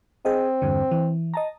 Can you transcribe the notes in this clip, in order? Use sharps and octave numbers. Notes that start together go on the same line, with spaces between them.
C4 G#4 D#5
E2 G2 D3
E3
D#5 A5 A#5